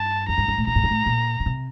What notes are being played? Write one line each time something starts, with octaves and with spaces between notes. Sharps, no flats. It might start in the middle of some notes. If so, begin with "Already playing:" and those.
Already playing: G2 A5
F2 A#5
G2
G2
A2
A#2 A#5
A2
G2
A2
A#2
D3
C3